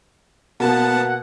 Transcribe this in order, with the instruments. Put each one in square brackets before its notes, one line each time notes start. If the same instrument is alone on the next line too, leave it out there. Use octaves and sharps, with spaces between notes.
[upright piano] B2 A#3 [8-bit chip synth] B3 A5 [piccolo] F#5